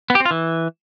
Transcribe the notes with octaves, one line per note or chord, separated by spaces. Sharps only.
B3
G4
C4
F4
E3